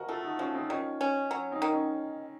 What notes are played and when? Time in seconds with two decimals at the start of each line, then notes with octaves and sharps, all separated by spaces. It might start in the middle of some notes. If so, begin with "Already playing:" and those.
Already playing: F3 F#4 A#4 D#5 F#5
0.09 A3 F4 A4
0.24 D#4 F#4
0.39 F3 C#4 F4
0.55 C4 D#4
0.69 D#3 C#4 F4
1.01 C#4
1.31 F#3
1.52 C4 D#4
1.62 D#3
1.72 C#4